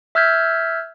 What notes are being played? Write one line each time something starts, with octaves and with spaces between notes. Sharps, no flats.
E5 E6 F6 G6 G#6 B6